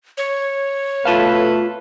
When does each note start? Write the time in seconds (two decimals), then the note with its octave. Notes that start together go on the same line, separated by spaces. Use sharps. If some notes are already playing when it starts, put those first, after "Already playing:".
0.17 C#5
1.05 B2 A3 F4 A4 B4 F5